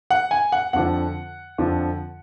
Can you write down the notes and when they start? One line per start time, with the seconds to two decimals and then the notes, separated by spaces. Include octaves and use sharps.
0.10 F#5
0.31 G#5
0.52 F#5
0.73 F2 D3 F3 F#5
1.58 F2 D3 F3